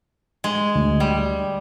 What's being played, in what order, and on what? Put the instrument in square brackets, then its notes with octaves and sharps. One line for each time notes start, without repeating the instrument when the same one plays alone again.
[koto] G#3
[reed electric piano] D2
[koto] G3